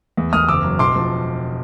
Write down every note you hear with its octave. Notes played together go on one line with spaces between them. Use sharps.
E2
E2 D#6 F6
F#1 D6 E6
F#3
E1 C6 D6
F3